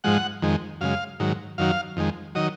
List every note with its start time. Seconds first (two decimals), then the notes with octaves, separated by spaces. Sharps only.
0.04 G#2 F3 G#3 F#5
0.42 F2 D#3 G#3
0.81 F#2 C#3 G#3 F5
1.20 G#2 D#3 F#3
1.58 F#2 D#3 F#3 F5
1.97 F2 D#3 G#3
2.35 D#3 F#3 D#5